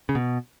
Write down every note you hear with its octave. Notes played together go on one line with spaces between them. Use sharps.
C#3
B2